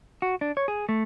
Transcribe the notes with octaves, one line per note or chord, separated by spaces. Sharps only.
F#4
D4
C#5
G#4
A3